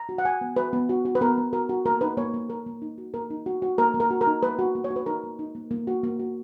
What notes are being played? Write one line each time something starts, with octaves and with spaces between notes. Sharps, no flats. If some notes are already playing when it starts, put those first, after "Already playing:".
Already playing: A#5
F#4
F#5
F#4 G#5
B3
F#4 B4
B3
F#4
F#4
B4
B3 A#4
B3
F#4 A#4
F#4
A#3 A#4
D#4 B4
A#3 C#5
A#3
A#3 A#4
A#3
D#4
F#4
A#3 A#4
D#4
F#4
F#4
A#3 A#4
A#3
A#4
F#4
A#4
D#4
A#3 B4
F#4
A#3
C#5
F#4
B4
D#4 A#4
A#3
D#4
A#3
A#3
F#4
A#3
F#4